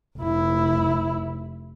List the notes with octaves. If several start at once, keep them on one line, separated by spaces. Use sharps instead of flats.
F1 E4